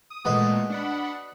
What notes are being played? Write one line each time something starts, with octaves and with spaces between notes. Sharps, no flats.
D#6
A#2 G#3 A3 F#4 B4 D#5
D4 F#5 B5